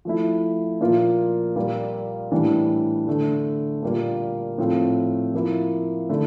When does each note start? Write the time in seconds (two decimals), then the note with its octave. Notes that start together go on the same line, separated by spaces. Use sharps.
0.05 F3 A3 E4
0.81 A#2 F3 A#3 F4
1.56 A#2 G3 A#3 F4
2.32 A2 E3 G3 D4
3.07 D3 A3 D4
3.82 A#2 G3 A#3 F4
4.58 A2 F3 A3 C4 F4
5.34 F3 A#3 E4
6.09 D3 A3 E4